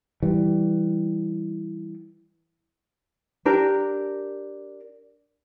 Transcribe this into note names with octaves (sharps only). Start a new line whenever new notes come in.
E3 G3
D4 G4 A#4